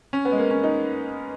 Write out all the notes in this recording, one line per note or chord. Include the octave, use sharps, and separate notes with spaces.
C#4
B3
G#3
A#3
C#4
D#4